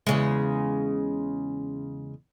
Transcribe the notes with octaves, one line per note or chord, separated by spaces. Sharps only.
E2 C#3 G#3